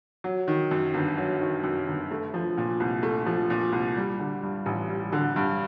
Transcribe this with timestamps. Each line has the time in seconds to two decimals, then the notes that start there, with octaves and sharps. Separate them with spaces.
0.24 F#3
0.48 D#3
0.71 F#2
0.94 G1
1.17 F#3
1.41 D#3
1.63 F#2
1.88 G1
2.11 A3
2.34 F3
2.58 A#2
2.80 C2
3.03 A3
3.26 F3
3.50 A#2
3.73 C2
3.97 G3
4.19 D3
4.43 G2
4.66 A1
4.89 G3
5.13 D3
5.36 G2